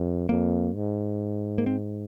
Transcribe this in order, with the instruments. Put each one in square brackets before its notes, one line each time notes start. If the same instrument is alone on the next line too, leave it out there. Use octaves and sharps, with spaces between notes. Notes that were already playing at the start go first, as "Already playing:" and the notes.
Already playing: [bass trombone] F2
[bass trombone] F2 [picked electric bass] A#3
[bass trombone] G#2
[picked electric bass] A#3
C4